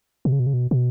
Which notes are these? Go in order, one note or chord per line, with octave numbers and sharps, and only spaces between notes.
B2
C#3
B2
C#3
B2
B2